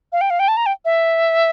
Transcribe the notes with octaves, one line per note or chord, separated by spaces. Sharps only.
F5
G5
F5
G5
A5
A#5
G5
E5